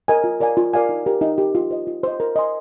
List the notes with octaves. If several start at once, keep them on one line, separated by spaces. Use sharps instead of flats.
A#4 D#5 G#5
F4
A#4 D5 F5 G#5
F4
A#4 D5 F5 G#5
D#4
G4 A#4
D#4
G4 A#4
F4
C5 D#5
F4
C5 D#5
A#4
D#5 G#5 C6